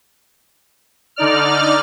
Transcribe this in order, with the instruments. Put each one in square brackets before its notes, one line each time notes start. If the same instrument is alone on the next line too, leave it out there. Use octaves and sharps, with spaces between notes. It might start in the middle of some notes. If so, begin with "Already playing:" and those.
[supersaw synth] D3 D#4 D5 F6